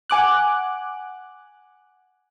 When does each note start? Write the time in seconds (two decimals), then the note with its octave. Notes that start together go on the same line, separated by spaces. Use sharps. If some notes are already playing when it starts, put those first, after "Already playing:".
0.10 F#5 G#5 D6 F#6